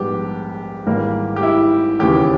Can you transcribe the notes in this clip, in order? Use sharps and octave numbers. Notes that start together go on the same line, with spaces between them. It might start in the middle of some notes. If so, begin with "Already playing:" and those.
Already playing: A#1 G#2 G3 B3 G4
G#1 G#2 E3 G3 A#3
G4
E4
E1 D#2 C#3 E3 G4